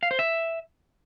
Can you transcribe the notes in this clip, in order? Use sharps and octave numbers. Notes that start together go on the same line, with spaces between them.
F5
C5
E5